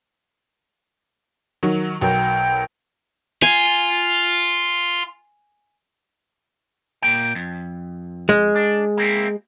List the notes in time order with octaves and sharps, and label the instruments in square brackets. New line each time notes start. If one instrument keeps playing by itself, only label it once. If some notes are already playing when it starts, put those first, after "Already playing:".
[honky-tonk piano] D#3 F#3
[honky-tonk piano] B1 F#3 A#4 [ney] G5
[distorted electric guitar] F4 [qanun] G#5
[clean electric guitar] A#2 A#3 G5
F2
[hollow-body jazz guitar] G#3
[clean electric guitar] D4
A#3 C4 E4